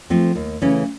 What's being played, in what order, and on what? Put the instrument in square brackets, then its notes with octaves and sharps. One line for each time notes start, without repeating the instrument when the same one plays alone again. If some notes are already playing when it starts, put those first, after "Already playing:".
[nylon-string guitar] F3 A3 C4
D#2
C#3 E3 A3 C#4